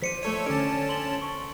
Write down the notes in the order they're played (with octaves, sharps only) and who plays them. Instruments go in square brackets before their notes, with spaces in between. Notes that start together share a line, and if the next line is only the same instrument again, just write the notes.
[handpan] F3 C5 D5 [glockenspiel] B6 C#7 D#7
[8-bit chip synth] A3 A4 C#5 [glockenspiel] D#7
[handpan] D3 A4 D5 [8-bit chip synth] C#4 A5 [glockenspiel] D7
[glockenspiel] C6 F#7 G7
C#6